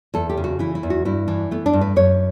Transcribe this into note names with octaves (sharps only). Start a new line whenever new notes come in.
E2 A4
G4
C#3
F#4
E3 E4
E4
E2
F#4
G2 E4
E3 D4
A3 B3
D4
G2
B4
F#2 C#5